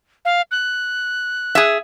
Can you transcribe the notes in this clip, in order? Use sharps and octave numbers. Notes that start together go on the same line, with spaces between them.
F5
F#6
G#4 E5